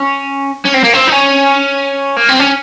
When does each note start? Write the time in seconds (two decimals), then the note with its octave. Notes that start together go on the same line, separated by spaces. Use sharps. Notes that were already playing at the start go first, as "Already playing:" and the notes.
Already playing: C#4
0.65 C#4
0.74 C4
0.84 A#3
0.93 C4
1.08 D#4
1.12 C#4
2.16 A#3
2.29 C4
2.39 C#4